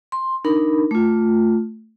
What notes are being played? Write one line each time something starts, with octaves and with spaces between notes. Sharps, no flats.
C6
D4 D#4 A#4 B5
A3 F4